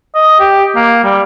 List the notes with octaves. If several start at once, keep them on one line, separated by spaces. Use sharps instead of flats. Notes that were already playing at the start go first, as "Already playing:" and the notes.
D#5
G4
A#3
G3